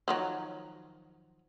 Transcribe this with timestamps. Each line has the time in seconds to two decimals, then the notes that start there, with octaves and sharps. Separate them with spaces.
0.08 D#3 F3 F#3